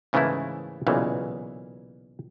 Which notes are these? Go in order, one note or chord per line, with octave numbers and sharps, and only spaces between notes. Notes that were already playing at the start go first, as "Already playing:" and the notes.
G#2 C#3 E3 A3 A#3 E4
B1 A#2 C#3 E3